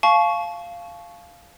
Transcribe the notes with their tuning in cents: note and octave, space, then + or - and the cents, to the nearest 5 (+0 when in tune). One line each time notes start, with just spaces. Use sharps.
F5 -5 A5 -35 C#6 +0